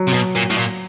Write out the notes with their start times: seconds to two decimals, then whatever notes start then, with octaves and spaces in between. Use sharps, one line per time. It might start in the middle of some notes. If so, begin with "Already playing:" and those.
Already playing: F#3
0.08 C3
0.14 B2
0.36 A#2
0.50 A2
0.58 A#2